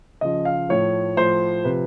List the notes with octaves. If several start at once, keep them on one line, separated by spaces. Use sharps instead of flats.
C#3 F3 D#5
F5
A2 F3 C#5
A2 F3 C5
C3 F3 B4